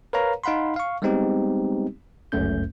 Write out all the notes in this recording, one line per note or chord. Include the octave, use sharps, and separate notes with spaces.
A#4 B4 C#5 F5 A#5
D#4 F5 F#5 B5 C6
F5 C#6
G3 G#3 B3 C4 D#4 G4
G1 C#2 F#2 A3 C#4 G6